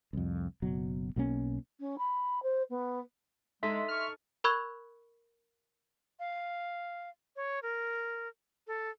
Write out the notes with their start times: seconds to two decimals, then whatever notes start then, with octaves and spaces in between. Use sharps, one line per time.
0.13 C2 F2
0.62 F#1 B2 F#3
1.16 B1 B2 A#3 C#4
1.80 C#4
1.98 B5
2.43 C5
2.70 B3
3.63 G#3 D#4 A4 D#5 E5 C6 B6
3.89 C#6 F6
4.44 A#4 B5 C#6 E6 F#6 G#6
6.19 F5
7.36 C#5
7.63 A#4
8.67 A4